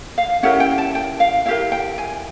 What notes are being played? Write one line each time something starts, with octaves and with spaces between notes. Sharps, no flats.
F5
C#4 E4 G4 A#4 F#5
G5
A5
G5
F5
E4 G4 A#4 F5
G5
G#5